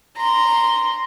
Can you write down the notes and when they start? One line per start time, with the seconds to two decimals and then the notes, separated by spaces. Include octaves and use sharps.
0.16 A#5 C6